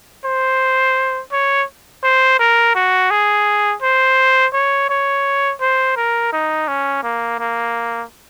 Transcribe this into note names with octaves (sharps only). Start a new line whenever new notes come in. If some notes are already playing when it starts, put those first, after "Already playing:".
C5
C#5
C5
A#4
F#4
G#4
C5
C#5
C#5
C5
A#4
D#4
C#4
A#3
A#3